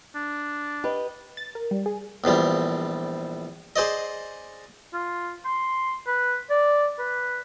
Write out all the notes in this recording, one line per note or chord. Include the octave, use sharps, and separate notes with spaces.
D4
G4 B4 D#5
A6
A#4
G3
G#4
A#1 E2 F3 G3
G#4 C5 D5 D#5
F4
C6
B4
D5
B4